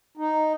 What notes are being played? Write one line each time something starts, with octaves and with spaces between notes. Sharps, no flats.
D#4